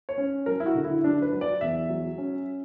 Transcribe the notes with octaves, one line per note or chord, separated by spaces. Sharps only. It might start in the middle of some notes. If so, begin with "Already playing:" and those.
C#5
C#4
F#3 A#4
E4
F#4
D3
E4
F#3 D4
B4
F#3
D5
E2 E5
F#3
C#4